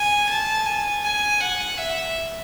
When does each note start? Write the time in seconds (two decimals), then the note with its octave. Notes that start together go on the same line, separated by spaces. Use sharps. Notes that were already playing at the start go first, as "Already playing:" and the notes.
Already playing: G#5
0.29 A5
0.66 G#5
1.03 G#5
1.40 F#5
1.78 E5